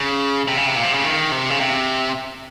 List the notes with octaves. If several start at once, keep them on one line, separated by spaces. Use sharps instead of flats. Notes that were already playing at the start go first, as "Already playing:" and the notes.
Already playing: C#3
C3
C#3
C3
A#2
C3
C#3
D#3
C3
C#3
C3